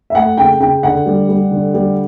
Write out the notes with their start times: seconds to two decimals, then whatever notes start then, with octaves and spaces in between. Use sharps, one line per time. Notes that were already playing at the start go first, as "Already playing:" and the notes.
0.10 E5
0.15 A3 F#5
0.38 C#3 G5
0.60 C#3 G5
0.83 D3 F#5
1.06 G3
1.29 G3
1.51 D3
1.74 G3